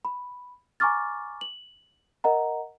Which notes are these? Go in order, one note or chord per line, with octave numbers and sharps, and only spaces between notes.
B5
G#5 A#5 C#6 D6 F6 A6
F#7
A#4 D#5 F#5 A#5